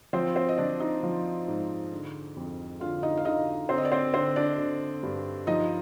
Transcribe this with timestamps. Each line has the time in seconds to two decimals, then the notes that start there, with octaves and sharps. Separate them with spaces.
0.13 F3 C4 C5
0.36 C4 C5
0.49 D#5
0.58 F3 D4 D5
0.80 D#4 D#5
1.03 F3
1.48 G#2
1.92 D3
2.37 F2
2.80 D3 F4 F5
3.03 D#4 D#5
3.17 F5
3.25 D3 D#4 D#5
3.69 D3 C4 C5
3.78 D#5
3.85 D5
3.92 C4 C5
4.14 D3 C4 C5
4.36 D4 D5
4.58 D3
5.03 G2
5.47 F3 D#4 D#5